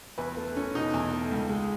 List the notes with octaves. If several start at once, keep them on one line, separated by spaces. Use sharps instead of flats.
E2 B4
A3
C#4
B2 D#4
E2
A3
C#2
G#3